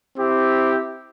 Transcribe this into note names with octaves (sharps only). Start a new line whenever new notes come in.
C4 E4 G4